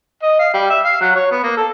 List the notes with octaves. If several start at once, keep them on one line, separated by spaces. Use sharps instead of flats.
D#5
F5
G3
E5
F5
F#3
C#5
B3
A#3
A4